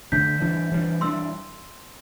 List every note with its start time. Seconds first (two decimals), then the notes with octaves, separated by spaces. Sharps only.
0.12 D3 A3 D4 G6 B6
0.41 E3 G3 D4
0.71 E3 G3 D4
1.01 E3 G3 D4 C6 E6